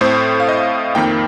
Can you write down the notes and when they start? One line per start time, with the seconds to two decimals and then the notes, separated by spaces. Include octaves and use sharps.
0.01 A2 A3 C4 C5
0.40 F5
0.49 D#5
0.95 F2 D#3 A#3 G5